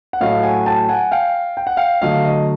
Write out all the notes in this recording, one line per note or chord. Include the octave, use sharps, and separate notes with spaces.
F#5
A2 F#3 A3 D#5 F5
F#5 G#5
G5 A5
F#5 G#5
F5 G5
G5
F#5
F5 G5
D3 F#3 A3 D#5 F5
D#5